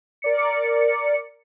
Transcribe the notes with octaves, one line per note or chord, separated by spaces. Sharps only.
A#4 D5 C#7